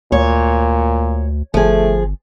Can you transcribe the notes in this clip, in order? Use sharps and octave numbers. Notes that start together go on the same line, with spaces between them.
D2 A#2 C#5
G1 F3 A3 G#4